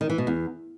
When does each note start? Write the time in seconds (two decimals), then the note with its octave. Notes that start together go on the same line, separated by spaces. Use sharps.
0.01 D#3
0.10 E3
0.18 B2
0.27 E2